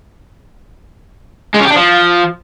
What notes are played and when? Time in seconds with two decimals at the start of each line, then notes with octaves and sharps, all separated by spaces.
1.54 G#3
1.60 C#4
1.65 G4
1.70 D4
1.76 F3